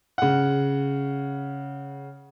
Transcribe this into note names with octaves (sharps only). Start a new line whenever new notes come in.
C#3 F#5